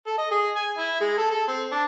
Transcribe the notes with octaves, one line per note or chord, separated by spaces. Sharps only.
A4
D#5
G#4
G#5
E4
G#3
A4
A4
C4
D4